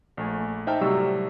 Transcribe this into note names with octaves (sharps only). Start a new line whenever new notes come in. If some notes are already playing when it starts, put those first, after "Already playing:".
A#1 A3 G#5
D#4 C5 E5 G5 A5 F6
A2 C3 F#3 G3 C#6 E6